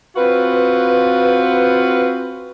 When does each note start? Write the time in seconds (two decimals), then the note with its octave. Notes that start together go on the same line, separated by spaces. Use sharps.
0.16 C4 F4 F#4 B4